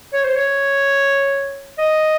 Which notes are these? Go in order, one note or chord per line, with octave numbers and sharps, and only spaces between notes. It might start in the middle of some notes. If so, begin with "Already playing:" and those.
C#5
C5
C#5
D#5